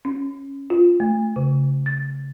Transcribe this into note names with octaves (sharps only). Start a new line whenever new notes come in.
C#4
F4
A3
C#3
A6